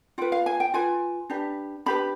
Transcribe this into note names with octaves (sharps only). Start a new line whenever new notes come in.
F4 B4 G5
F5
G#5
G5
F4 B4 G#5
D4 G4 B4
D4 G4 B4 B5